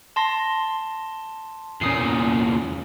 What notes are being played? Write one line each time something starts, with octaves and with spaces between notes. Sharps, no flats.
A5 C6 A#6
E2 A#2 C#4 D#6 C7